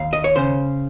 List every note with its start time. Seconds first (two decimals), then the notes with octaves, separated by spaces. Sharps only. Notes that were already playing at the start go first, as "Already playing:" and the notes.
Already playing: D#2 F5
0.13 D#5
0.24 C#5
0.36 C#3 C5